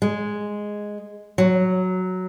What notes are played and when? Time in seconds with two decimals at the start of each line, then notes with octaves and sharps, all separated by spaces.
0.02 G#3
1.38 F#3